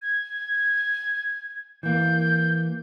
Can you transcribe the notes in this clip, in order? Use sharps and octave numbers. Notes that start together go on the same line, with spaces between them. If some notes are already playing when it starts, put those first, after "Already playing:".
G#6
E3 A#3 G6